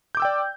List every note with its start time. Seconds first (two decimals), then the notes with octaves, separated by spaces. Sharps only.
0.15 G6
0.17 D6
0.20 E6
0.22 G5
0.25 D5